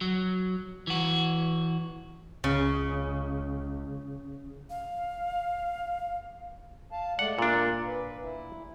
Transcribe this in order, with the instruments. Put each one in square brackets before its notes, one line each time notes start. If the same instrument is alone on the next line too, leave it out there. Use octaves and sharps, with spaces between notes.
[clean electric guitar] F#3
E3 F#4
[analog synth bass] C#2 [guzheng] C#3
[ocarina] F5
[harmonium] F5 A5
[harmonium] G#3 A3 D5 [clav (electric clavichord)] F#5
[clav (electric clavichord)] A#2 D4 [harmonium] F4 A#4
[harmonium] B4
E4